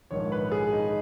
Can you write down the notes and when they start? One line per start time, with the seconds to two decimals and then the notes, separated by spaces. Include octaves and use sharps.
0.11 A#1 G#2 D#3 C#5
0.32 B4
0.51 G#4
0.73 D#4